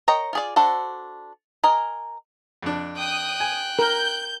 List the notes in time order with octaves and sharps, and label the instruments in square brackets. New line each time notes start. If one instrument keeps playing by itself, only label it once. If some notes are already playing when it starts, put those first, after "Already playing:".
[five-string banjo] A#4 C#5 D#5 G5 A#5
F4 G#4 D5
D4 F#4 A4 C5
A#4 D#5 G#5
[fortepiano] F2 D4
[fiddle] G5 F#6 [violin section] D#6
[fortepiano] G#5
[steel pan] A#4 [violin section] G6